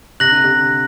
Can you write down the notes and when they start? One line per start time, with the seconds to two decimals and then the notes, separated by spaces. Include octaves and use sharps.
0.20 C3 F#6 A#6 F#7
0.32 D3
0.44 C3